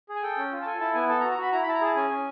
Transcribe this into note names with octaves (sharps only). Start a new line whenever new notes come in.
G#4
G#5
A4 G5
C#4
F4
A5
A4 G#5
E4 A5
B3 G#5
A4 A5
A#5
F#4
A#5
F#4 B5
E4 A#5
B5
E4 A5
A#5
G#4 A5
C#4 G#5
C#4